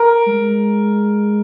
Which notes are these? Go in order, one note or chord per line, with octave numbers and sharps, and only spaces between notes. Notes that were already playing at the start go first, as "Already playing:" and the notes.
Already playing: A#4
G#3